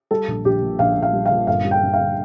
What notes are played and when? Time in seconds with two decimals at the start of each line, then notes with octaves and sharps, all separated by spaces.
0.11 G3 A4
0.28 A#1
0.45 A#1 G4
0.62 A#2
0.79 A#1 F5
0.96 A#2
1.02 F5
1.13 G3
1.26 F5
1.31 A#2
1.47 G1 F5
1.65 G3
1.71 G5
1.83 G2
1.94 F5
1.99 D3